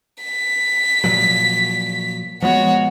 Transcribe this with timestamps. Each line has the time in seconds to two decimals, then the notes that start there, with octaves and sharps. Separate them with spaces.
0.24 B6
1.04 A#2 F3 F#3
2.42 F3 G#3 B3 F#4 C#5